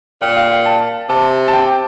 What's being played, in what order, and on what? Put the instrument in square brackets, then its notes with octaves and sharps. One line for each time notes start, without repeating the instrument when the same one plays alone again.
[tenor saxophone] A#2 [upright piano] G5
[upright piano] F5
G5
A5
[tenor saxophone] C3 [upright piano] A5
[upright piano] A5
G5